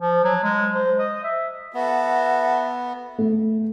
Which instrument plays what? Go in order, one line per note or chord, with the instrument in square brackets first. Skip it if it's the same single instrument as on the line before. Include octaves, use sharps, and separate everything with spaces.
[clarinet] F3
F#3
G#3
C5
D#5
E5
[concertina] B3 [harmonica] F#4 A4 [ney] E5
[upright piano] A3